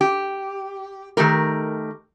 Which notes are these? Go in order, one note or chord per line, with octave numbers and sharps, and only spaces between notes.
G4
D#3 A3 G4 A#4